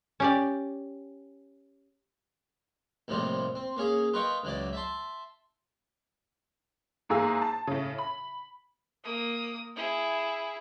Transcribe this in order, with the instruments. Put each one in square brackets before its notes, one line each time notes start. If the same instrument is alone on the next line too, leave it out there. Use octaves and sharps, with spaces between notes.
[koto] C#4 G4 D5
[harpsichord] D#2 A2 C3 F3 G3 C4
C4
A#3 C#4 G#4
F4 A#4 B4 D#5 G5 C#6
C#2 E3 F#3 D5
E5 A5 C6
[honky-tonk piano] E2 G#2 A#3 G#4 E6
A5
A2 C#3
B5
[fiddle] A#3 D#6
E4 G#4